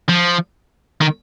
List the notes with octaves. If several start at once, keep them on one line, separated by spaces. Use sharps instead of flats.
F3
D#3